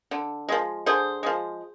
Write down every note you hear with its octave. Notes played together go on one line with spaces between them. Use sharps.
D3
F3 G#3
D3 G#4 C5
F3 G#3